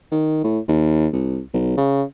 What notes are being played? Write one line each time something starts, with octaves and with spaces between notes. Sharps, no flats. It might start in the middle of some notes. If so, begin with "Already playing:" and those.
D#3
A2
D#2
C2
B1
C#3